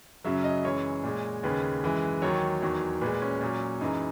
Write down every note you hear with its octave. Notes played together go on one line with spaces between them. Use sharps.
F#2 C#3 F#3 E5
D#5
F#2 E3 G#3 C#5
A#2 G#3
D#2 C#3 G#3 B4
F#2 E3 G#3
D#2 D#3 F#3 C#5
E2 D#3 F#3
A#2 G#3 B4
C#4
A#2 F#3
F#2 E3 G#3 D#4